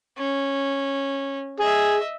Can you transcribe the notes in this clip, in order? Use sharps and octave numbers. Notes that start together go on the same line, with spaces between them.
C#4
G#4 D#5 E5